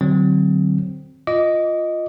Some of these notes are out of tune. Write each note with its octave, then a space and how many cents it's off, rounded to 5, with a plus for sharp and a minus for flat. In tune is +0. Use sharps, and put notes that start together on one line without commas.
D3 +25 F#3 +15 C4 +0
F4 +0 D#5 +0 D6 -25